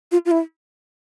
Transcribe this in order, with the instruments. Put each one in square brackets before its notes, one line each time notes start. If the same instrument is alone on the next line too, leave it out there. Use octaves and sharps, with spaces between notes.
[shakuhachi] F4
F4
E4